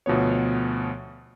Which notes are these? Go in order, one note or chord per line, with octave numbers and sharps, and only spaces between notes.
D2 B2 F3 B3 C#5